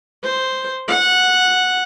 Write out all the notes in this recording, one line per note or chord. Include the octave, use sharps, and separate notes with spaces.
C5
F#5